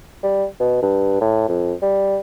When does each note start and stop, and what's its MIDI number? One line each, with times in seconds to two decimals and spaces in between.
0.23 0.45 55
0.60 0.78 47
0.82 1.19 43
1.21 1.44 45
1.49 1.73 41
1.82 2.19 55